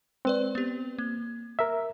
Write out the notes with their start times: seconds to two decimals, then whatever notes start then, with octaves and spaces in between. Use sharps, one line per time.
0.25 G#3 C4 B4 D5
0.55 B3 G4
0.98 A#3
1.59 A#4 E5